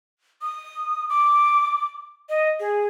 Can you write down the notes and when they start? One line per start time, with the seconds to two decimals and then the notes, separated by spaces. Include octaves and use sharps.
0.42 D#6
1.10 D6
2.29 D#5
2.60 G#4